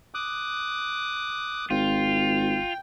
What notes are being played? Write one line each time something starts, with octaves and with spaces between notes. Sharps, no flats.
D6 D#6 F#6
G#1 F4 G5